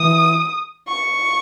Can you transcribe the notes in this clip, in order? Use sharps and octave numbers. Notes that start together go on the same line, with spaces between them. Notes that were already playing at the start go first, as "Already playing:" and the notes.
Already playing: E3 D#6
C#6